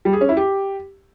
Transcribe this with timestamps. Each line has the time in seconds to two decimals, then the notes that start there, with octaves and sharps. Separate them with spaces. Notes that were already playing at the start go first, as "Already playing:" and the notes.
0.05 G3
0.13 G#4
0.21 C#4
0.29 E4
0.37 G4